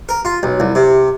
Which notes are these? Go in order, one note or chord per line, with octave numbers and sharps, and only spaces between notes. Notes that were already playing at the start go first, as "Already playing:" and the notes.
A#4
F4
B1
C2
C3